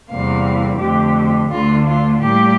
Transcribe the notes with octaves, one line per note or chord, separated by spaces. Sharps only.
E2 C3 G3 A#3 F5
F2 D3 A3 G4
D2 D3 A3 F4
F4
A2 G3 A#3 G4